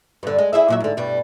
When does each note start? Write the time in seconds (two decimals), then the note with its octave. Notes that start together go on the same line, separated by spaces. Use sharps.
0.23 G2 D3
0.39 G#3
0.53 E4 G#4 E5
0.68 A#2 F#3 E5
0.80 G#2 D3
0.97 G2 B2 G3